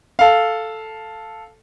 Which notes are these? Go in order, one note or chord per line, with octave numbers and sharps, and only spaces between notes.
A4 F5